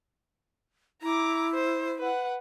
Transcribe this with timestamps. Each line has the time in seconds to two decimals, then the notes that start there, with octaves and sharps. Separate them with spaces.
1.02 E4 A#5 D6
1.54 C5
1.99 B4 F#5